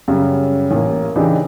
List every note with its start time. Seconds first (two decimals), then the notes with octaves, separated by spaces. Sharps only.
0.08 F#2 C#3 G3
0.71 A1 A#3
1.16 C#3 E3 D4 D#4 G4 G#4